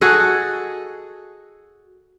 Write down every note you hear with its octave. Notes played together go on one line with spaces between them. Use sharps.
F#4 G#4 A4 D#5